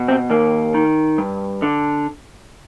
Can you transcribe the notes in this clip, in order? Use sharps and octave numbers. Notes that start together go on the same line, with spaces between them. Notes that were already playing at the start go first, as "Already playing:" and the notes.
Already playing: B2
C4
D#2 A#3
D#3
G2
D3